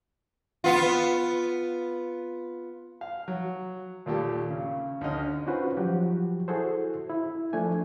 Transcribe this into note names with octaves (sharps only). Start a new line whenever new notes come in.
B3 F4
F5
F#3
D#2 A#2 A3 G4
C#3
D2 D3 C#4 D#4 D#5 F6
C#4 D#4 F4 F#4 B4 C5
F3 F#3 F#4 G4
E4 F#4 G#4 A4 C5
E4
F3 A3 D4 G#5